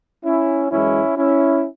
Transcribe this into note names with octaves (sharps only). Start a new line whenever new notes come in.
C#4 E4
F#2 E3 G#3 C#4 E4
C#4 E4